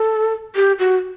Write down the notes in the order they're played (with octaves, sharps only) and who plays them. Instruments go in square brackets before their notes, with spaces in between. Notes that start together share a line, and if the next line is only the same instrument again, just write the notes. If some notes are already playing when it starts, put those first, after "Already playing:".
Already playing: [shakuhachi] A4
G4
F#4